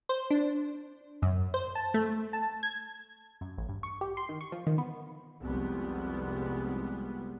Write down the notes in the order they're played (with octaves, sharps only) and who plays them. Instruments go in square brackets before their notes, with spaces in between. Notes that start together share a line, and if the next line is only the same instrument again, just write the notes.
[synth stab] C5
D4
F#2
C5
A5
A3
A5
G#6
[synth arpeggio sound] F#2
A1
G2
C#6
G4
C6
D#3
C#6
F3
D#3
B3
[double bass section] F1 C2 G3 G#3 B3